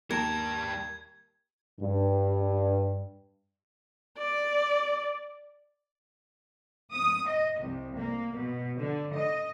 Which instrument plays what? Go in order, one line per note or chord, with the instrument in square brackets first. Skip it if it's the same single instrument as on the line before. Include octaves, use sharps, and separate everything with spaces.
[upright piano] D#2 [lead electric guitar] G3 A5 [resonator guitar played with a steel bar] A#4 [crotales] G#6
[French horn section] G2
[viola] D5
[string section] D#6
D#5
C2
A#3
B2
D3
D#5